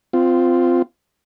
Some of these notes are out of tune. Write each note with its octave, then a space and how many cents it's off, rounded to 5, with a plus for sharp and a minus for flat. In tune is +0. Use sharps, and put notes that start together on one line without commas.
C4 -20 F4 +0